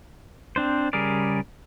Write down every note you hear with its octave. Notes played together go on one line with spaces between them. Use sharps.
C4 D4 C5
C#3 G3 G#4 A#4 D5